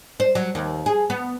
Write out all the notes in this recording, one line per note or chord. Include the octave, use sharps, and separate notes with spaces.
C5
F#3
D#2
G#4
B3